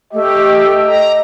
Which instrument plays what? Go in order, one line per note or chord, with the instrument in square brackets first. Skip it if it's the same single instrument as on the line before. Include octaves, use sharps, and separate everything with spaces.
[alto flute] A3 [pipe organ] G4 [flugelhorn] D#5
[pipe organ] A#5